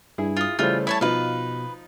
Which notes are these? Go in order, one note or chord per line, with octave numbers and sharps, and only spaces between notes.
G2 E4 G#4
F4 D#6
C#3 E3 G3 A3 C#4 F4 C5
E4 C#5 A5
B2 F3 D#4 F4 B4 F5